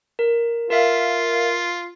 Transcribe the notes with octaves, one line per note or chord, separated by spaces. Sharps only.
A#4
F4 A#4 E5 F5